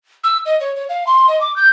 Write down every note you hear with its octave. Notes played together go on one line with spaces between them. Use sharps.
E6
D#5
C#5
C#5
F5
C6
D#5
D6
G6